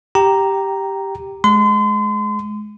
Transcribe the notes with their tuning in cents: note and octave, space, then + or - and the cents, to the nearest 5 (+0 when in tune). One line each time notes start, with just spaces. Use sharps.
G4 +0 G5 -15 A#5 +0
G#3 +25 C6 -35